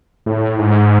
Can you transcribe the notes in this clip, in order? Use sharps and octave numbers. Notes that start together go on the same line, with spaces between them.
A2
G#2